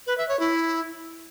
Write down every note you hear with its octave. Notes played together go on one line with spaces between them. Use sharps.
B4
E5
C#5
E4